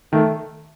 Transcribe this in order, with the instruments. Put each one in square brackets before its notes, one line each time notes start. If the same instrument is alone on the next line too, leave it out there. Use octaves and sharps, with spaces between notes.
[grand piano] D#3 [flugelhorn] A3